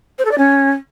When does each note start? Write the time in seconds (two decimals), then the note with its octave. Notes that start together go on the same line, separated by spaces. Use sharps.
0.18 C5
0.25 A4
0.31 D5
0.38 C#4